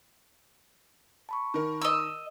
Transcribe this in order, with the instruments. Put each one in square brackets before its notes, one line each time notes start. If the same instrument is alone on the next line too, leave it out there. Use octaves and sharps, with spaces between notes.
[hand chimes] A5 B5 C#6
[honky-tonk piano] D#3 A#4
[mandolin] D#5 E6